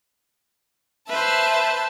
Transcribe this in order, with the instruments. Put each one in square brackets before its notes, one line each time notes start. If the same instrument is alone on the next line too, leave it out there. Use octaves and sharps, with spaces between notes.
[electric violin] B4 C5 [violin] E5 A5